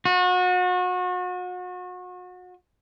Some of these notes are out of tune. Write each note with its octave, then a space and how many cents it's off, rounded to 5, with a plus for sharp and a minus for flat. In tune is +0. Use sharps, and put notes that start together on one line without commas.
F#4 -35